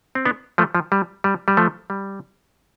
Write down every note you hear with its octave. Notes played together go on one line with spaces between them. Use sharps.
C4
B3 D4
F3 A3
F3
G3
G3
G3
F3 A3
G3